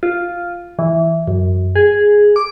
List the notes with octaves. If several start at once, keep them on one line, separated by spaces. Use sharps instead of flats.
F4
E3
F#2
G#4
D6